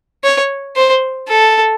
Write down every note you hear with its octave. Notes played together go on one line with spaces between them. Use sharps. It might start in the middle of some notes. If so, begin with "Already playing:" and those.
C#5
C5
A4